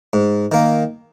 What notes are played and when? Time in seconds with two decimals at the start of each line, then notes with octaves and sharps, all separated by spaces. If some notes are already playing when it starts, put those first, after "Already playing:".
0.13 G#2
0.52 D#3 A#3